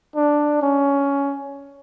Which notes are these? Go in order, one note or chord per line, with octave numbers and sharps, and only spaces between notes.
D4
C#4